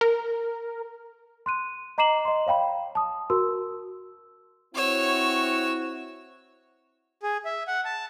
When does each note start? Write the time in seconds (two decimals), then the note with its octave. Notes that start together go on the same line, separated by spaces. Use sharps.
0.01 A#4
1.46 C6 F#6 D#7
1.98 D#5 A#5 D6 C7 E7 F#7
2.25 D#5 C6
2.47 C#5 F5 G5 B5
2.95 A5 D#6
3.30 F#4 A#4 C6 E6
4.75 C4 E4 F#4 C#5 E6
7.23 G#4
7.45 E5
7.68 F#5
7.85 A5